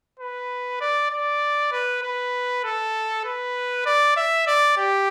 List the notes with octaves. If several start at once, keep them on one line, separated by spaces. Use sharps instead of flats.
B4
D5
D5
B4
B4
A4
B4
D5
E5
D5
G4